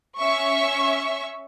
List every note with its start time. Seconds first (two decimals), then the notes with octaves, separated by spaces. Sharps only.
0.18 C#4 E5 C#6